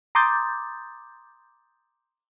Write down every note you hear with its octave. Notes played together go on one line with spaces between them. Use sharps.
A#5 C6 D6 D#6 G6 A6